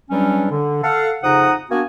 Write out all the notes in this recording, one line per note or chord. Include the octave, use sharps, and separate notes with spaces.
E2 F#3 G3 C#4 D4
D3
A4 F5 F#5
F2 C#3 D#4 F#5 A#5 D#6
A#3 B3 D4 F#4 G#5